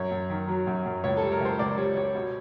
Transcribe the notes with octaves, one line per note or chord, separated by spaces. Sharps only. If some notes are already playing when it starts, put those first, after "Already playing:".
Already playing: F#2 C#5
F#2
D#3
F#3
F#2
F#2
C#2 C#5
G3 A4
A#4
C#2 C5
C#2 D5
G3 C#5
G3 C#5
B2